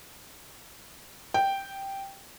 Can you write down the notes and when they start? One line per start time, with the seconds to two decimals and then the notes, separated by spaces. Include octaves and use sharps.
1.34 G5